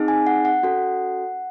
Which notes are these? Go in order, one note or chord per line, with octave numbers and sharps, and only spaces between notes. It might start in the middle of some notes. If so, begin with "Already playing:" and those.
Already playing: C4 D#4 G#4
G#5
F#5
F#5
C#4 F#4 A4